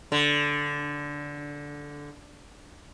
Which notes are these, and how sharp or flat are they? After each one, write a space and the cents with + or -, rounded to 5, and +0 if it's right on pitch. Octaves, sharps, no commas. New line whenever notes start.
D3 -10